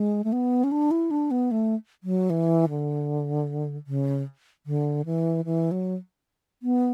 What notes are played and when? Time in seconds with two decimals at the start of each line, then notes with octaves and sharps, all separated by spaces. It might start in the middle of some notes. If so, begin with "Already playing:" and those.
Already playing: G#3
0.24 A3
0.32 B3
0.64 C#4
0.72 D4
0.91 E4
1.11 D4
1.31 B3
1.51 A3
2.03 F#3
2.30 E3
2.69 D3
3.87 C#3
4.66 D3
5.06 E3
5.45 E3
5.71 F#3
6.63 B3